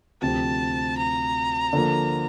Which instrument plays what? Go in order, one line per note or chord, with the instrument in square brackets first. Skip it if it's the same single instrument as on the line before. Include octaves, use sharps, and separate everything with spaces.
[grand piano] D2 C3 F3 C4 G4 [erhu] A5
[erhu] A#5
[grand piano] D3 F3 A#3